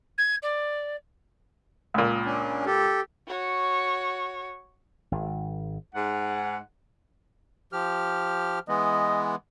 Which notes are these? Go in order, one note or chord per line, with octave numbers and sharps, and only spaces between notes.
G#6
D5
C#2 A#2
C#4 D4
G4 A4
F#4 C#5
G#1
G#2 F#5
F3 G4 F6
E3 G#3 B3 D#5